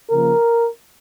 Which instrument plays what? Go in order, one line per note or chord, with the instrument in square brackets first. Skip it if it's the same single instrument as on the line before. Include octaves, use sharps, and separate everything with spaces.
[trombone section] C#3 F3 A#3 A#4